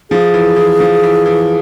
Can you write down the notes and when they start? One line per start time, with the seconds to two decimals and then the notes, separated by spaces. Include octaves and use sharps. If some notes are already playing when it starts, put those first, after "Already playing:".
0.10 F3 G#4
0.34 E3
0.56 E3
0.80 F3
1.03 E3
1.26 E3